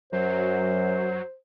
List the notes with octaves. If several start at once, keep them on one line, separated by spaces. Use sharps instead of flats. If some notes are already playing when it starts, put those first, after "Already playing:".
F#2 F#3 C5